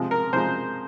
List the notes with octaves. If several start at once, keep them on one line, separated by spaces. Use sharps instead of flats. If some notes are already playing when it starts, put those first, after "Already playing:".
Already playing: C3 F3 G#3
A#4
C3 F3 G#3 C5